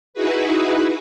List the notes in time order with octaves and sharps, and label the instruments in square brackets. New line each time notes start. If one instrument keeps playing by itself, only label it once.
[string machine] D#4 E4 F#4 G#4 B4